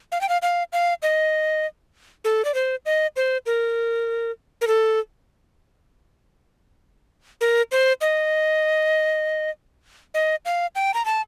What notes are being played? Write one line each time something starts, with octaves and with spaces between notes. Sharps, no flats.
F5
G5
F5
F5
F5
D#5
A4
D5
C5
D#5
C5
A#4
A#4
A4
A#4
C5
D#5
D#5
F5
G5
A#5
A5